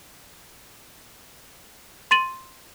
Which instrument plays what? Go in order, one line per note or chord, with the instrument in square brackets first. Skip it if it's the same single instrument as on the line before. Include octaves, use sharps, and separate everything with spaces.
[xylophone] C6 A6 D#7 F#7